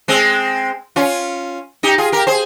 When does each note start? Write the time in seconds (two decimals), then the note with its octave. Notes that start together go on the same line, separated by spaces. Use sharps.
0.08 G#3 C4
0.96 C#4 F4
1.83 D#4 G4
1.98 F4 G#4
2.12 G4 A#4
2.27 G#4 C5